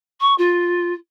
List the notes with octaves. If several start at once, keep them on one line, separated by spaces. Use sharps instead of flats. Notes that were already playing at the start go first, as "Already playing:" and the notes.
C#6
F4